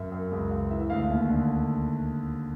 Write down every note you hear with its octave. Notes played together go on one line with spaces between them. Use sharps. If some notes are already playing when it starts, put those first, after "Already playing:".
Already playing: F#2 E5
F#2
C#2
C#2
E3 E5
E5
D2 F5
F5
D#2 E5
D3